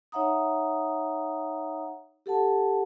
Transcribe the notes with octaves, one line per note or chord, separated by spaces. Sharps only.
D#4 C#5 E5 F#5 A#5 D#6
G4 A4 F#5 A5